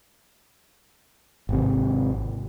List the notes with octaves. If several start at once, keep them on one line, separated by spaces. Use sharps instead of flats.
G#1 C3